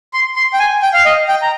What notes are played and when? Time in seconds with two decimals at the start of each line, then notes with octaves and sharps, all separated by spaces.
0.14 C6
0.36 C6
0.53 G5
0.59 G#5
0.82 G5
0.94 F5
1.05 D#5
1.28 G5
1.42 A#5